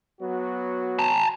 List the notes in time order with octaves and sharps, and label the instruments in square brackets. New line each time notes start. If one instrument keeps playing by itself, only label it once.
[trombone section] F#3 B3 F#4
[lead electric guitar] A5 A#5